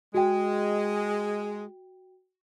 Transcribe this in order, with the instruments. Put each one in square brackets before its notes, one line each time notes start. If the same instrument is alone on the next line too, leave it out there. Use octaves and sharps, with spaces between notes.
[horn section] G#3 [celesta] F#4 G5